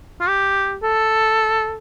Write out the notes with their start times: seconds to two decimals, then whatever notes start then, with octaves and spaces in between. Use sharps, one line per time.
0.20 F4
0.28 G4
0.83 A4